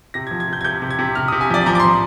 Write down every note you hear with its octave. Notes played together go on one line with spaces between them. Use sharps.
C3 A#6
F3 G#6
G#6
C3 G6
G#6
C3 G6
C3
G#6
C3
C3 F6
C3 D#6
G#5
F3 D5
F3 A#5
D6
F3 C6